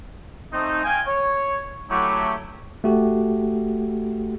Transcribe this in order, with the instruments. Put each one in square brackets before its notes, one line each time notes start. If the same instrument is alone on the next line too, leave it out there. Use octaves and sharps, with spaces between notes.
[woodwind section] A3 C4 D#4
F5 G5 G#5
C#5
F#3 A3 E4 G4
[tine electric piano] A3 F#4 G4